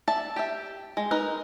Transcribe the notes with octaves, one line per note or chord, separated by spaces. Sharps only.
D5 E5 A5
G4 E5
G#3
D#4 A#4 B4